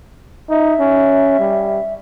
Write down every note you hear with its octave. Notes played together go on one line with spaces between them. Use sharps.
D#4 E5
C#4
G3